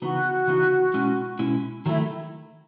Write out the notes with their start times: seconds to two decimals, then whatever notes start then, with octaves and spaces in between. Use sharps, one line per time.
0.01 C#3 E3 B3 D#4 F#4
0.47 C#3 E3 B3 D#4
0.94 B2 G#3 C#4 E4
1.39 B2 G#3 C#4 E4
1.85 D#3 F#3 A3 E4